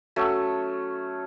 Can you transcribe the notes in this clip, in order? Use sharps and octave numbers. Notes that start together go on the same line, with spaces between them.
F#3 A3 C#4